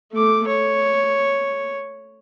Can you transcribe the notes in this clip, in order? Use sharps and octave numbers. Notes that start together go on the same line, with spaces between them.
A3 D6
C#5